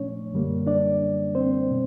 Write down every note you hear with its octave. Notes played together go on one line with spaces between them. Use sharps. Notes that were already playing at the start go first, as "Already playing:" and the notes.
Already playing: A#2 F3 A3 C#4 D4 C#5
F#2 D3 G3 A#3
D4 D5
C4 C5
B2